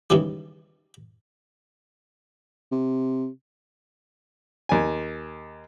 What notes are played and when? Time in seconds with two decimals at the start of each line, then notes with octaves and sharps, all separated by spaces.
0.10 D#2 G#2 C#3 E3 G3
2.72 C3
4.69 D#2 G#5